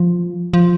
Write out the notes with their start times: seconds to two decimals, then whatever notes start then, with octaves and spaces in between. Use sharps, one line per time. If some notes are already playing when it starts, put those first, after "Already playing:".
Already playing: F3
0.53 F3